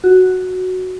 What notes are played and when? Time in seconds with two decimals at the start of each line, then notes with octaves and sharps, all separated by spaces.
0.04 F#4